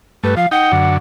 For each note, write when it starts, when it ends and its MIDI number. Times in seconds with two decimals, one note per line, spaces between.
0.24 0.35 43
0.24 0.35 57
0.24 0.34 71
0.37 0.46 53
0.37 0.48 77
0.51 0.72 63
0.51 0.94 78
0.51 0.72 79
0.72 0.98 42
0.72 0.98 50